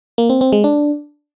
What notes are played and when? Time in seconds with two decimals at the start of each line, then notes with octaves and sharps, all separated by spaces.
0.18 A#3
0.30 C4
0.41 C4
0.52 G#3
0.64 D4